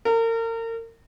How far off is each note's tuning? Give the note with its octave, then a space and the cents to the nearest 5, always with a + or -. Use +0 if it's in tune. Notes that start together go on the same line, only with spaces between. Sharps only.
A#4 -35